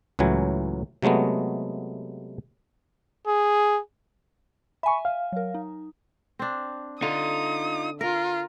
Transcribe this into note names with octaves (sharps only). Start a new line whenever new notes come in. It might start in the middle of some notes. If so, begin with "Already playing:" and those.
C#2 A2 E3 F#3 G#5
C3 F#3 G#3 A3 B3
G#4
E5 G#5 B5 C#6
F5
F#3 A#4
D#4
C4 D4
D3 D#4 F4 D#6
F4 A#4